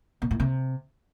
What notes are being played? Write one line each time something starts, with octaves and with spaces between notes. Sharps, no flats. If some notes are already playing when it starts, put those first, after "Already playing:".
B2
A2
C3